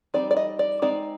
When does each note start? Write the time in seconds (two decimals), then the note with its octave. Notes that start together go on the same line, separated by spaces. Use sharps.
0.14 G3 C4 D#4 D5
0.31 D5
0.37 D#5
0.59 D5
0.82 G#3 C4 D#4 D5